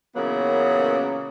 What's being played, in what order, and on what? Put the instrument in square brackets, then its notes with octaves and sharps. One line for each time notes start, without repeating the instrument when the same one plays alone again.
[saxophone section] A#2 C#3 E3 F#3 A#3 B3